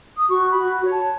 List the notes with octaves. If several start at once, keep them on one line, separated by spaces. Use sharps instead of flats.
D#6
F#4 C#6
B5
F#4
C#5
A5